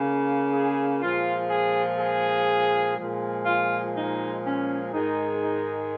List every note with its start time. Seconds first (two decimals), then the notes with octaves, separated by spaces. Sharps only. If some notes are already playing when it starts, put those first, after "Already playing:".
Already playing: C#3 A#3
0.52 G#4
1.01 A#2 F3 G#3 F4
1.50 G#4
1.99 G#4
2.97 A#2 F3 G#3
3.45 F4
3.94 D#4
4.43 C#4
4.92 G#2 D#3 G#3 D#4
5.41 D#4